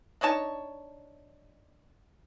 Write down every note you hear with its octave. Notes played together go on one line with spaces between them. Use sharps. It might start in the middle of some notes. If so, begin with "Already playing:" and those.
D4 D#4 C#5 A5